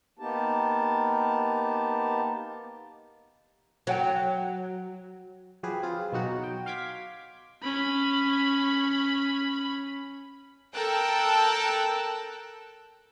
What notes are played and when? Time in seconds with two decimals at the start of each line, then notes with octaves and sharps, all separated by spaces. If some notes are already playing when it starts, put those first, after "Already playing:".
0.19 A#3 B3 D#4 G4 A5
3.87 F#3 C#5 F#5 G5
5.63 F3 F#3 G4 G#4 B4
5.83 C4 F4 G#4 B4
6.12 B2 F#3 D#4 F#4
6.44 G5
6.66 F5 C6 D6 G#6 B6
7.63 C#4 B5
10.74 A4 A#4 G5 A5 E6 F#6